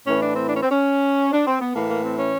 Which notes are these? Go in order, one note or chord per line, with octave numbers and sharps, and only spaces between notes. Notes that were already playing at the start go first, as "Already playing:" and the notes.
A2 E3 C#4
D4
C4
D4
C#4
C4
C#4
D4
C4
B3
A2 E3 A#3
A#3
C4
C#4